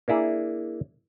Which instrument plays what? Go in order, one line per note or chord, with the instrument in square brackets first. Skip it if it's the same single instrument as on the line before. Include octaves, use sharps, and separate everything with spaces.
[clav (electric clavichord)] A#3 D4 E4 G#4